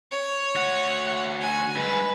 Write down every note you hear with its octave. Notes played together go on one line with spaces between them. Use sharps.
C#5
D2 F#5
F#4 G#5
G2 G#3 B4